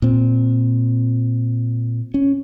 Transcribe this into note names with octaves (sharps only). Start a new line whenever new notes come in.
A#2 C4
C#4